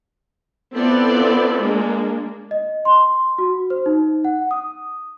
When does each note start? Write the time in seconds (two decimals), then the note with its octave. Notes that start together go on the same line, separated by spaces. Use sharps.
0.74 B3 C4 E4 F4 A4 D5
1.60 G#3 A#3 D4
2.51 D#5
2.85 C6
3.38 F#4
3.70 C5
3.86 D#4
4.25 F#5
4.51 D#6